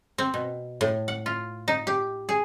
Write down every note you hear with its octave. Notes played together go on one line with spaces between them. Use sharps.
C4
B2
A2
F#5
F4
D#4
G4
G#4